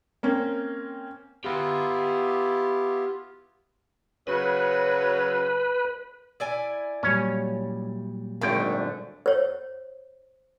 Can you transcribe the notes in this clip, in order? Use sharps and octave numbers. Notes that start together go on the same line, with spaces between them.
A#3 C4 C#4
B3 E4 F4 G4 A#5
C#3 F#3 B4
E4 D5 G#5
A#2 F#3 G3 C#4 C#5
G#1 F#2 D3 A3 G5
C5 C#5